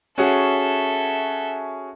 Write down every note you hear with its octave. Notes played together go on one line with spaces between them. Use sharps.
C#4 F#4 G#4 A4 E5